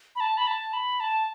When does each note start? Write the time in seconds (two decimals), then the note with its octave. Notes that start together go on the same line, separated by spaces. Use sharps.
0.16 B5
0.20 A5
0.37 B5
0.47 A5
0.73 B5
1.00 A5